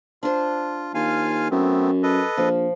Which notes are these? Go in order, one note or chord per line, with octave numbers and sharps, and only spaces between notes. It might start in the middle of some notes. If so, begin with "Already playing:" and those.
D4 F4 C5
D#2 F4 F5 G#5
F#2 A3 B3 C4
A4 B4 D#5
A#1 F3